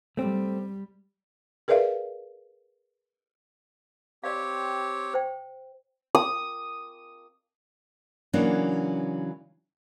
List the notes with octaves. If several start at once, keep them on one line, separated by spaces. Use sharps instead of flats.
G3 A3 C4
G#4 A#4 B4 D5 E5 F5
C4 G4 C#5 D5 F5
C5 G5
D#6
C#3 E3 F#3 A#3 C#4 D4